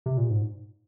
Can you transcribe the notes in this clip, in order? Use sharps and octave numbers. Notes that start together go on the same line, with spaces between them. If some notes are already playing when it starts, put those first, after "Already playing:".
C3
A#2
G#2